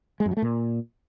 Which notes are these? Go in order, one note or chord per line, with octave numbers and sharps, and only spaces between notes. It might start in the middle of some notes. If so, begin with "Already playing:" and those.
G#3
F#2
F#3
A3
A#2